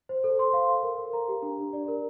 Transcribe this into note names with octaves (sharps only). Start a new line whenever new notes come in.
C5
A4
C6
F5
F5
A#4
A#4
A#5
G4
D4
D4
D5
A#4